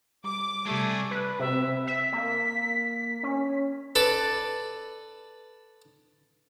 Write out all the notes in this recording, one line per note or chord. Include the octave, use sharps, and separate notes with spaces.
G3 D6
C3 G3 A3 D4 G#4
B4
C3 E5
E5 B6
A#3
C#4
A4 B4 D5